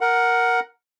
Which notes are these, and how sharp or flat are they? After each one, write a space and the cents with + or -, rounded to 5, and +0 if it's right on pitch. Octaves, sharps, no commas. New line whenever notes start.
A#4 +5 F#5 +0